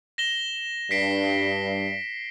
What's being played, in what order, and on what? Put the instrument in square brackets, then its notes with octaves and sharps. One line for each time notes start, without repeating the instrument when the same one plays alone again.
[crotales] A#6 E7 G7
[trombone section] G2 [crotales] B6 C7 D7